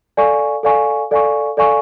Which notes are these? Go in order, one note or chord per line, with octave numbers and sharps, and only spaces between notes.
A4 D5 F5 G#5 C#6
A4 D5 F5 G#5 C#6
A4 D5 F5 G#5 C#6
A4 D5 F5 G#5 C#6